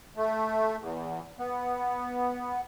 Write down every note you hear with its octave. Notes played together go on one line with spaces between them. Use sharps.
A3
E2
B3